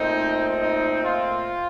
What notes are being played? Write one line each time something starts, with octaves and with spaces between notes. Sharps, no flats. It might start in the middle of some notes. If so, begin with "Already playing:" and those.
Already playing: A#2 A3 C4 D#4
D#4
F4